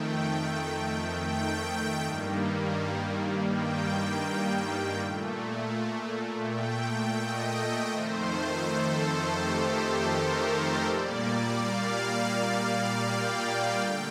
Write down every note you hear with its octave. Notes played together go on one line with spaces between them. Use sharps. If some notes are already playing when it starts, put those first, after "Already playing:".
Already playing: F2 D#3 A3 G5
G5
G2 D#3 G3 A#3
G5
A#2 A3
G5
G5
D#5
F2 D#3 A3 C5
A4
G4
A#4
A#2 G3 A#3 D5
F5
F5
G5
D3 A3 G5